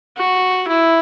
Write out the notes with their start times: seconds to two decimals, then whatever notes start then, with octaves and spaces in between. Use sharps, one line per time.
0.17 F#4
0.68 E4